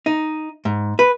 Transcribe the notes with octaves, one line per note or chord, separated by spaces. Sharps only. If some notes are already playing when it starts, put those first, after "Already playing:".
D#4
G#2
B4